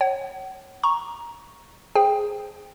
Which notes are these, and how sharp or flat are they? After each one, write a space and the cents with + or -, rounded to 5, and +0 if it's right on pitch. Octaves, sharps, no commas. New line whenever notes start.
C#5 -15 F#5 +45
A#5 +15 C#6 +0
G#4 +5 C5 +0 G5 +20